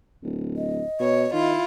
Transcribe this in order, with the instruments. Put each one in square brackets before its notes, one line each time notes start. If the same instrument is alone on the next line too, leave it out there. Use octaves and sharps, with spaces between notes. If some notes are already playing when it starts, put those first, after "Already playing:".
[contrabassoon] D1
[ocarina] D#5
[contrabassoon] B2 [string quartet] C#5
[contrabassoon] D#3 [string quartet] E4 F4